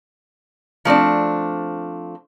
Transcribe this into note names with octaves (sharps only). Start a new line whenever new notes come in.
F3 A3 C4 D4